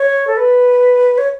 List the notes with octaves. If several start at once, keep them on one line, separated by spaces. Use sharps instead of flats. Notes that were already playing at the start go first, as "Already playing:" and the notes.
Already playing: C#5
A4
B4
C#5